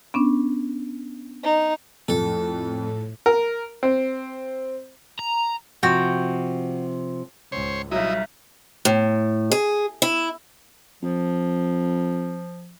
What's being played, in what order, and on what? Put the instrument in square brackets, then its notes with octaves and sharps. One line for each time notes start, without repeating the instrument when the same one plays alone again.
[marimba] B3 C#4 D4
[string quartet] D#4
[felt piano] F2 [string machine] A2 [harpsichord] A4
[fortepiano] A#4
C4
[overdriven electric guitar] A#5
[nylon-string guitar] C3 F3 [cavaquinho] F#4 G5
[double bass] C#2 G#2 [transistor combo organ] C5 C#5
[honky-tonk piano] B1 F#3 [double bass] G3 [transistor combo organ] E4 D#5 [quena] E5
[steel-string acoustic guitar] A2
G#4
E4
[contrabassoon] F2 [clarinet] F3